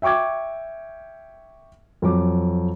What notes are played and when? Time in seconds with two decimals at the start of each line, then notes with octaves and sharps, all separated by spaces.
0.02 E5 G5 C#6 D6 G#6
2.02 F2 F#3 D6